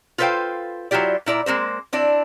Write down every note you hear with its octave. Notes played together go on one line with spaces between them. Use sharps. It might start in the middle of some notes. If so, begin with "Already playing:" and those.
F4 A4 B4 C5 F5 G5
F#3 E4 F4 G4 D5
A#2 E4 D5 A#5
G#3 A#3 C4 C5
C4 D4 E4 D5